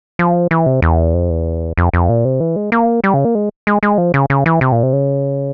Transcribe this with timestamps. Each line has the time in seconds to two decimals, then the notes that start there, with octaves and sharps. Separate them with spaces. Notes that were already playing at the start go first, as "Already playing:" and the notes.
0.19 F3
0.51 E3
0.66 C3
0.82 E2
1.14 F2
1.30 E2
1.78 F2
1.94 F2
2.09 A#2
2.25 C3
2.40 E3
2.56 G#3
2.72 A#3
3.04 G3
3.14 C#3
3.25 A#3
3.35 G#3
3.67 G#3
3.83 G#3
3.98 F3
4.14 C#3
4.30 C#3
4.46 E3
4.61 C3
4.72 A#2
4.83 C3
4.93 C#3